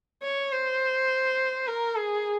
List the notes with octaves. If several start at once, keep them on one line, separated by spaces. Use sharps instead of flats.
C#5
C5
A#4
G#4